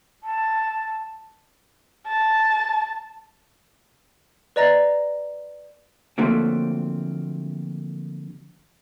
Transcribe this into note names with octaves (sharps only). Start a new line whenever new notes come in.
A5
A5
B4 D5 D#5 A#5 A6 A#6
D3 F3 F#3 A3 A#3 C4